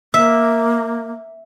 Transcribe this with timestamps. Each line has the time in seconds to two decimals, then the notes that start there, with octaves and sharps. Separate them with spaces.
0.14 A#3 E5